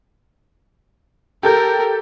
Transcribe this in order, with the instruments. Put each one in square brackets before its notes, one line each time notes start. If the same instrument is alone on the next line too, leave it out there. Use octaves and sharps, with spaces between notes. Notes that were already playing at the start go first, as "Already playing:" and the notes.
[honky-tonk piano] G4 A4 G6 [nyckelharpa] A#4